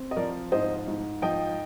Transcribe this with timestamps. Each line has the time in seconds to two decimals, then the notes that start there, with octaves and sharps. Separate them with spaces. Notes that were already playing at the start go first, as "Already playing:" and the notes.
Already playing: C4
0.11 D#5
0.16 F3 A#4 D5
0.52 G#2 C5 D#5
0.88 G#2
1.22 F3 D#5 G5